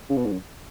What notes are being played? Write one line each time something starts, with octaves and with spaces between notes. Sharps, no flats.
C#3
B2
G#2
F#2